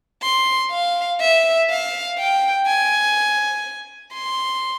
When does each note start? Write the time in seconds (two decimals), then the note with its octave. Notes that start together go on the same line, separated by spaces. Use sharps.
0.22 C6
0.71 F5
1.20 E5
1.70 F5
2.18 G5
2.66 G#5
4.13 C6